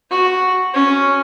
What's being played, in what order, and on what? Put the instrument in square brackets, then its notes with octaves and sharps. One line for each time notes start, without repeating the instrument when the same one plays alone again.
[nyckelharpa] F#4
C#4